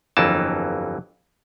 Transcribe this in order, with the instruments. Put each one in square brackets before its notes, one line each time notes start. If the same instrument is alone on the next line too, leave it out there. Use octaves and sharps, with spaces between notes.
[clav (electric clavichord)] G1 F2 E3 F#3 A#3 A5